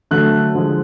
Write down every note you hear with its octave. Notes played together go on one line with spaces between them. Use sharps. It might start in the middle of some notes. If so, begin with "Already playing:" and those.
D3 F#3 A3 F#6
D3 F3 G#3